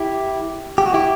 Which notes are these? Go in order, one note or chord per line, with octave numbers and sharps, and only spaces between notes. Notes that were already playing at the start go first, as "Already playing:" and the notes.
Already playing: E4 G4
G4
F#4
E4 G4